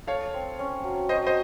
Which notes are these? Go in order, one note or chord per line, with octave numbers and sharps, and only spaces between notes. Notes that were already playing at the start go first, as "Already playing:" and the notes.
A4 C#5 F5
C4
C#4
F#3
F#4 C5 D#5
C5 D#5